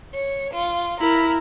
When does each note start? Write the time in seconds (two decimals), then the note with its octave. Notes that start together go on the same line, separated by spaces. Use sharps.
0.14 C#5
0.54 F4
1.00 E4 A#4 A#5 B5